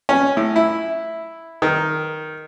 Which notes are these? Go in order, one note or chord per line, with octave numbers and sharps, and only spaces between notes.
C#4
A2
E4
D#3